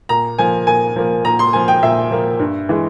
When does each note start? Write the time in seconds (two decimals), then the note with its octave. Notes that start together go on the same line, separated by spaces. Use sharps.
0.09 A#2 A#5
0.38 F3 A#3 G#5
0.67 A#2 G#5
0.96 F3 A#3
1.24 A#2 A#5
1.39 C6
1.53 F3 A#3 G#5
1.68 G5
1.83 A#2 E5
2.11 F3 A#3
2.39 G2
2.69 E3 G#3